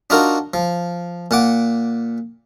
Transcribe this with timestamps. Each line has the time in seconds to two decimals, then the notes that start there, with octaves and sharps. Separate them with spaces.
0.10 D4 D#4 F4 F#4 A#4
0.54 F3
1.31 A#2 F#5 D6